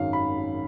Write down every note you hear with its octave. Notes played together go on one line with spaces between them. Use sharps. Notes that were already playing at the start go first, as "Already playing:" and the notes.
Already playing: G#1 F#2 D#3 F5
B5